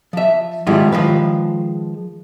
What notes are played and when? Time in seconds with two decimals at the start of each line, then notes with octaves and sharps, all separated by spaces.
0.13 F3 E5
0.67 F2 G#2 D#3 G3 E4 F4
0.92 D#3 F3 G#3 B4